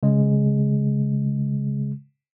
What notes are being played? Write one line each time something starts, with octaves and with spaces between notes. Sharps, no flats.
C#3 G#3